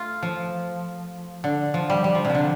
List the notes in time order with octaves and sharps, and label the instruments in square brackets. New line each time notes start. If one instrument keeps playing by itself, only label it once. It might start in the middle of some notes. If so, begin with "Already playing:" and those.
Already playing: [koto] A3 F4
F3
D3
F3
G3
G3
F3
C3
F3
D3